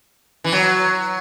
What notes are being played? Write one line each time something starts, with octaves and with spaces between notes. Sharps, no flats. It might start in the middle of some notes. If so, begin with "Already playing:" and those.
E3
F#3